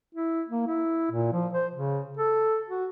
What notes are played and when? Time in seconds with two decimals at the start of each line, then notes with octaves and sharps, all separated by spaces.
0.15 E4
0.48 A#3
0.68 E4
1.11 A#2
1.33 F3
1.53 C5
1.74 C#3
2.17 A4
2.69 F#4